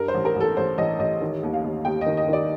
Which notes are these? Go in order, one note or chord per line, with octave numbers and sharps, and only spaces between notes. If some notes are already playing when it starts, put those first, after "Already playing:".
Already playing: G2 A#4
C5
A1
A#4
A1 A4
A1 C5
A1 D#5
A1 D#5
D#3
D#2
F5
D#2
D#2 G5
D#5
D#3
D#5
D#3 D5